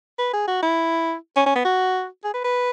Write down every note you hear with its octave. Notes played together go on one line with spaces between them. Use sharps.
B4
G#4
F#4
E4
C#4
C#4
B3
F#4
G#4
B4
B4